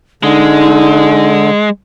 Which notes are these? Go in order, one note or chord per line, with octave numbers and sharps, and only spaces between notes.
D3 G#3 D#4